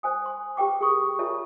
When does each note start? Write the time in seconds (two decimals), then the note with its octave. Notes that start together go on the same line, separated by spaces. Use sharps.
0.03 C5 G#5 D#6
0.26 C6
0.57 G4 B4 G5 D6
0.81 G#4 A#4 B4 C#6 D#6
1.19 F4 A#4 C#5 E5 A5 A#5